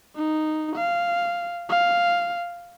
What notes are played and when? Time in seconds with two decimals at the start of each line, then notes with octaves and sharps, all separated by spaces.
0.16 D#4
0.76 F5
1.69 F5